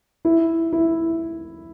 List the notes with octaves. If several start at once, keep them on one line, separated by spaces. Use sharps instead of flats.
E4
E4